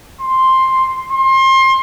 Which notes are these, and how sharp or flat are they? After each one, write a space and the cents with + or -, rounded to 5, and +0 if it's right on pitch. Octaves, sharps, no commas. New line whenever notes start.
C6 +5
C6 +30